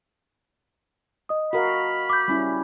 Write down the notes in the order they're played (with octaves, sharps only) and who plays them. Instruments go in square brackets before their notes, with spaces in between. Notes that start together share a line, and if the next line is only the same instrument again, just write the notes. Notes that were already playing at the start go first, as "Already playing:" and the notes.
[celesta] D#5 D#6
[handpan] F#4 A#4 F5 [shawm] B5
[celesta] D6 G6
[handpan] G3 C#4 E4